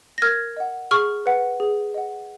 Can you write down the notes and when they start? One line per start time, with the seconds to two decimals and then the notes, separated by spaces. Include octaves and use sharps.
0.18 A#6
0.22 A#4 F6 G#6
0.57 D#5 F#5
0.91 G#4 C#6 F6
1.26 B4 F#5
1.60 G#4
1.94 D#5 F#5